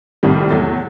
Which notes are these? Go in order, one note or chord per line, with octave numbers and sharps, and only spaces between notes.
C2 A2 C3 D#3 G3
E2 F#3 A3 A6